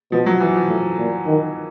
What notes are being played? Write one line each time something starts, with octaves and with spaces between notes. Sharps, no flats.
B2 F3
F#3
E3
F3
A2
A#2
D#3